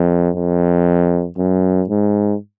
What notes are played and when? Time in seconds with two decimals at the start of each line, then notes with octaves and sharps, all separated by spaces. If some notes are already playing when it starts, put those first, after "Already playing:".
Already playing: F2
0.35 F2
1.37 F#2
1.89 G#2